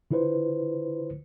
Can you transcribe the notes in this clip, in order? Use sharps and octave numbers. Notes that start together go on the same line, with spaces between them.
D3 E4 F4 B4 C5